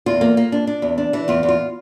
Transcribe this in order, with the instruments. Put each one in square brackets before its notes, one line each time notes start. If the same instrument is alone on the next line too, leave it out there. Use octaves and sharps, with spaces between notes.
[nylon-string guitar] E2 F4
A#3
A#3
D4
D4
E2
D4
E3
E2 F4
E2
F4